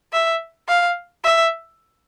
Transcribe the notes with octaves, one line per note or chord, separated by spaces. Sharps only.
E5
F5
E5